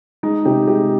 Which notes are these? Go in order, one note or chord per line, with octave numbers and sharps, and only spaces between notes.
G#3 D#4
C3 G4
G#3 G4